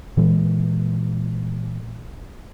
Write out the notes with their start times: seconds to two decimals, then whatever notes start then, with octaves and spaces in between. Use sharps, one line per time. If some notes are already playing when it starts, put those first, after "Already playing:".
0.17 A#2 E3 G#3